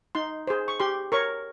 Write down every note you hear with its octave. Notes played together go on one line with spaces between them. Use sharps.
D#4 C6
G#4 C5
C#6
G4 C6
A#4 C#5 C#6